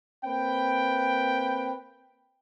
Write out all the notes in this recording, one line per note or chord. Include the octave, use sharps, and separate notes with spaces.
A#3 C4 B4 G5